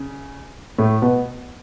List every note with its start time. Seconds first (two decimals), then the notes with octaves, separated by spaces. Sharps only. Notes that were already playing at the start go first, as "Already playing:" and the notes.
Already playing: C#3
0.78 A2 A3
1.02 B2 B3